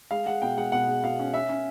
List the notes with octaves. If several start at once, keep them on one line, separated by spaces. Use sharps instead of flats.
G#3 F5
G#3 F#5
B2 G5
G#3 F#5
B2 F#5
G#3
B2 F5
C#4
C#4 E5
C#4